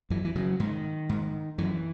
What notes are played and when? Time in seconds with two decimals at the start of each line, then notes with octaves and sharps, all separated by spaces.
0.10 F#2 E3
0.25 E3
0.36 C#3 F#3
0.60 G#2 D#3
1.09 G#2
1.58 F#2 E3